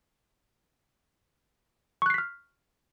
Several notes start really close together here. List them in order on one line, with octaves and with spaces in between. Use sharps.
C#6 F#6 C7 B6 F6